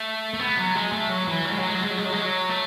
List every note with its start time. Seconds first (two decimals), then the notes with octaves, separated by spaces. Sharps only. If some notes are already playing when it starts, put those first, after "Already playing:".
Already playing: A3
0.34 A3
0.39 B3
0.57 F#3
0.75 G#3
0.92 A3
1.09 F#3
1.28 E3
1.45 F#3
1.52 G#3
1.59 F#3
1.67 G#3
1.75 F#3
1.82 G#3
1.90 F#3
1.97 G#3
2.05 F#3
2.12 G#3
2.20 F#3
2.49 A3